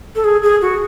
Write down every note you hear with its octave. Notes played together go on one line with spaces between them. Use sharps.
A4
G#4
G#4
F#4